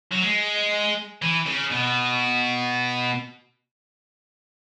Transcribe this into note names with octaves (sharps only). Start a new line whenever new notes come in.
F#3
G#3
E3
C#3
B2